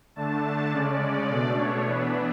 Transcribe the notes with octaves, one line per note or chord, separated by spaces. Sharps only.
D3 A3 D4 A5
A5
C#3 G#3 C#4 D5
B2 A3 D4
C#5
E3 B3 D4 B4